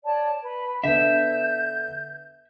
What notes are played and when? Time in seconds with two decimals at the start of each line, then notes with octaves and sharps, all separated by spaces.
0.04 C#5 D5 A5
0.42 B4
0.84 D3 B3 E5 G6